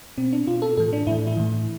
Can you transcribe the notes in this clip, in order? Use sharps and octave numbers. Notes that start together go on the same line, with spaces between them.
B2 C4
D4
B2 F4
A4
A2 E3 A4
D4
A2 E3 E4
E4
A2 E3